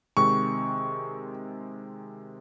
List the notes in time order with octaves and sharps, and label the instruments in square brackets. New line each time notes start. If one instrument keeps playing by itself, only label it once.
[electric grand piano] C3 D#3 G#3 C4 [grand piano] C#6